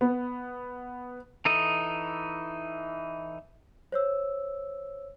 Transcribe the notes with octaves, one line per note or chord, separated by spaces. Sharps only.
B3
E3 D#4 A4 D#6
C5 C#5 E6